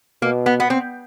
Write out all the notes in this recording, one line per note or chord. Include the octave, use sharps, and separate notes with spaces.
B2 A#3
B3
B3
C4